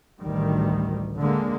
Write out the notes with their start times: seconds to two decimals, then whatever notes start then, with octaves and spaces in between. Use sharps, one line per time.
0.19 A1 D2 D#3 G3
1.17 D3 G#3 A#3